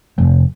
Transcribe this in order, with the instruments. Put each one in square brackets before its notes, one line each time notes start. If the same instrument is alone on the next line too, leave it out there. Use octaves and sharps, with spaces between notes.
[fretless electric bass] F1